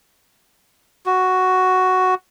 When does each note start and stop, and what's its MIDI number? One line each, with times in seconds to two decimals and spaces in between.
1.06 2.15 66